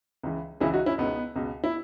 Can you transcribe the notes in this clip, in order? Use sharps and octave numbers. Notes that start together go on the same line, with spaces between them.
C#2 C#3 E3
C#2 C#3 E3 E4 G#4
D#4 F#4
C#4 E4
C#2 B2 B3 D#4
C#2 B2
E4